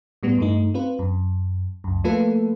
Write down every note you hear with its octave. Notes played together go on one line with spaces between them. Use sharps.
A2 G3 B3
G2 A3 D#4
C4 F4 B4
F#2
C#2 F#2
F3 A3 A#3 F4 A4 B4